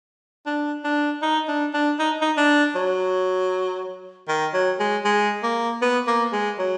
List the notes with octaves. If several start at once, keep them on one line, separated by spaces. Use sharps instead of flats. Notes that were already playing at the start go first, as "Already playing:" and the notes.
D4
D4
D#4
D4
D4
D#4
D#4
D4
F#3
D#3
F#3
G#3
G#3
A#3
B3
A#3
G#3
F#3